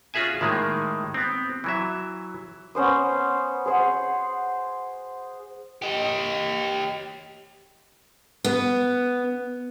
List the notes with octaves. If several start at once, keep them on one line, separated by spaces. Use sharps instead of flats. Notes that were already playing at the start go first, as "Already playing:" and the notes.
C#4 F4 F#4 G#4 E5 G#5
A2 D#3 G#3 A#3
B3 C4
E3 F#3 E5
B3 C#4 C5 D#6
G#4 C5 F#5
G4 D#5
B3